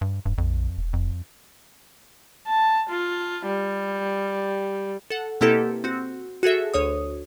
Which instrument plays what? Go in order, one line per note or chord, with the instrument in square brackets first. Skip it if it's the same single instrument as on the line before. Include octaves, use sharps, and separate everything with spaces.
[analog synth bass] G2
[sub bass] D#1 [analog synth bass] G2
[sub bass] A#1 [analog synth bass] F2
[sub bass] E1
[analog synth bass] F2
[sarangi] A5
F4
G3
[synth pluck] A4 F#5
B2 A#3 C4 E4 G4 A4
C4 F#4
F#4 G#4 A4 E5
D2 C#5 D#6